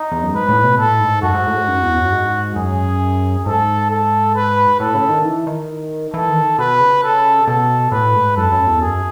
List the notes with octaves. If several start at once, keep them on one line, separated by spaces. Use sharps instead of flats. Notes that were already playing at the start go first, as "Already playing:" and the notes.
Already playing: D#4
E2
F#2
G#2 B4
A2
B2
A2 A4
G#2
F#2 F#4
G#2
A2
G#2
F#2
E2
F#2
G#2
F#2 G#4
G#2 A4
A4
B4
A2 A4
C#3
D#3
E3
D#3
E3 A4
D#3
B2 B4
C#3
A4
B2 A4
A2 B4
G#2
F#2 A4
F#2
E2
F#2 G#4